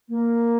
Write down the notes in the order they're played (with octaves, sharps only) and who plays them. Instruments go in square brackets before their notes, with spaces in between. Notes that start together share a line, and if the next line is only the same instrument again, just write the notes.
[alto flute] A#3